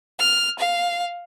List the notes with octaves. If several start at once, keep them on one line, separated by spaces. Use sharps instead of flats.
F6
F5